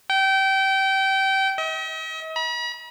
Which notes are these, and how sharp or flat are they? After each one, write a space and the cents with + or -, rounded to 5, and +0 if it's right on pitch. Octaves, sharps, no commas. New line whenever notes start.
G5 -25
D#5 +45
B5 -45